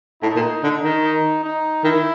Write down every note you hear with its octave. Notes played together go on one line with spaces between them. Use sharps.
A2 D#4
A#2
D3
D#3
D#4
D#4
D#3 E4